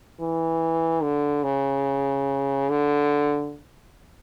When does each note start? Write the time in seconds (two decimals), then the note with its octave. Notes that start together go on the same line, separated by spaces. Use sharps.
0.20 E3
1.02 D3
1.44 C#3
2.70 D3